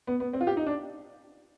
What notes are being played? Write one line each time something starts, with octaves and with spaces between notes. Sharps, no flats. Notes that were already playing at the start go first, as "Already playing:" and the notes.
B3
B3
C4
F4
G4
D#4
D4